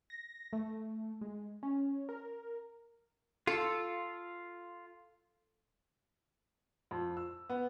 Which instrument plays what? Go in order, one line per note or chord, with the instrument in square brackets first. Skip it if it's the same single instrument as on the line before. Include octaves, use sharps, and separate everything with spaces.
[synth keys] A#6
A3
G#3
C#4
A#4
[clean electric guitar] F4 [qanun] A4
[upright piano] F2
E6
B3